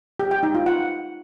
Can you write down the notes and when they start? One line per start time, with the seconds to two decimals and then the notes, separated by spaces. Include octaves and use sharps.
0.20 G4
0.31 G5
0.43 D#4
0.55 F4
0.66 F#5